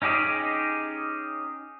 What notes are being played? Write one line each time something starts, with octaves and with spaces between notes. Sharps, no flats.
C#4 D#4 G4 G#4